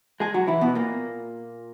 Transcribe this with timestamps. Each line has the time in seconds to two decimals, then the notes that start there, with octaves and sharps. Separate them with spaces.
0.20 G#3 G#4
0.34 F#3 F#4
0.47 E3 E4
0.61 B2 B3
0.75 A#2 A#3